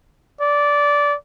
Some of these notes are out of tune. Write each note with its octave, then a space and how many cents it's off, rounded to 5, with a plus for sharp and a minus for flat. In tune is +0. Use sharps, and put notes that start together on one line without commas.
D5 -15